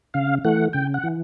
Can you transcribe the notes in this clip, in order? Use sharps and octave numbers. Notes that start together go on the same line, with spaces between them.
C#3 F5
E3 A3 F#5
C#3 G5
F#5
E3